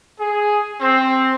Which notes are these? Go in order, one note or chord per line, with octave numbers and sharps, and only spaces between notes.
G#4
C4